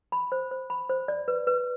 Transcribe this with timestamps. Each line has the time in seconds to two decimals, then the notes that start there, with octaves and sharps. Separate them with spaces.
0.12 B5
0.32 C5
0.51 C5
0.70 B5
0.90 C5
1.08 D5
1.28 B4
1.47 B4